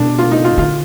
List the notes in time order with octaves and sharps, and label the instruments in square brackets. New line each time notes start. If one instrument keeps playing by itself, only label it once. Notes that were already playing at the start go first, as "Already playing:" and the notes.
Already playing: [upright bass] B2 [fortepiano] D4
[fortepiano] F4
D#4
F4
[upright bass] D3 [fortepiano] F4